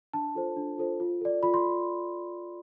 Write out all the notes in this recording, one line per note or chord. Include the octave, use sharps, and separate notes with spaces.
D4 A5
F4 A4 C5
D4
F4 A4 C5
F4
A4 D5
F4 B5
C6